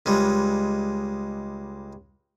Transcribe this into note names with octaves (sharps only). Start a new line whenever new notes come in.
C#2 G3 G#3